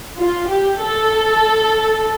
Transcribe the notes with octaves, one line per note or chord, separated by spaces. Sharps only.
F4
G4
A4